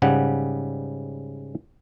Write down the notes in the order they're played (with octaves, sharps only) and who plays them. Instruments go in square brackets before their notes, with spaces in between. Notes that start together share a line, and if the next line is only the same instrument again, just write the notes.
[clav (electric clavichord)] G#2 C#3 G3 F#5